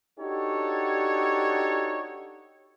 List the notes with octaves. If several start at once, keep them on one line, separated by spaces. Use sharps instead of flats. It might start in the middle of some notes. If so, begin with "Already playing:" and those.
D4 D#4 F#4 G4 A4 C#5